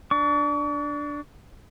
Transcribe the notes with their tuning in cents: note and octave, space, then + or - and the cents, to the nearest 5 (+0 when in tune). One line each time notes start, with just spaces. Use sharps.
D4 +0 C#6 +45